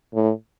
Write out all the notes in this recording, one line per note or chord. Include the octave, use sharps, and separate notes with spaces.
A2